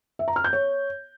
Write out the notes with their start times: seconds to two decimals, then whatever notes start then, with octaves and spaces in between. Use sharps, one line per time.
0.19 E5
0.28 A#5
0.36 F6
0.44 G6
0.53 C#5